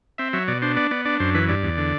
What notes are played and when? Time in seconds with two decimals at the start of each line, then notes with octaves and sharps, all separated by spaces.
0.18 C4 E5
0.33 F#3 E5
0.48 B2 D5
0.62 D4 C5
0.76 B3 D5
0.91 B3 D5
1.05 D4 D5
1.20 F#2 C5
1.35 E3 B4
1.49 G2 D5
1.63 E2
1.77 D3